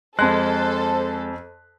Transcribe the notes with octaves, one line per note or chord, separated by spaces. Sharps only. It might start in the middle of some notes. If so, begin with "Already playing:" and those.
F2 G#3 A4 C5 F#6